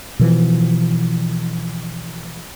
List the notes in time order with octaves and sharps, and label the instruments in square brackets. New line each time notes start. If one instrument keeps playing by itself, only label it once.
[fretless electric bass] B2 E3 F3